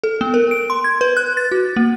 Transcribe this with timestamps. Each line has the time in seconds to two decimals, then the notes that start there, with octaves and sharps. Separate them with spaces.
0.04 A4
0.21 B3
0.34 A#4
0.51 D7
0.70 C6
0.84 G#6
1.01 B4
1.17 F#6
1.37 A6
1.52 F#4
1.76 A#3